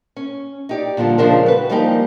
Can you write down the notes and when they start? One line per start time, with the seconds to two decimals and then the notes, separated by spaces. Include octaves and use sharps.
0.17 C#4
0.69 D#4 G4 D5
0.97 A#2 D3 F3 G3 F4
1.18 C#3 F3 G#3 D4 A#4 C5
1.46 F#4 G4 B4
1.70 F3 G3 G#3 A#3 D#4 G4